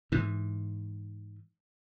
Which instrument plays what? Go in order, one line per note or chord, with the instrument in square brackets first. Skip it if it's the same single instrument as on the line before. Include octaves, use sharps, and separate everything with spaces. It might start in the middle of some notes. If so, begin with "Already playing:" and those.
[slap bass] G#2 E3